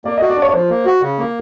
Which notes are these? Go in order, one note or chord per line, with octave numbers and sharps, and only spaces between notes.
A#3 D5
D#5
F#4
D5
D4 C#5
C#5
F3 C5
A#3
F#4
C#3
A#3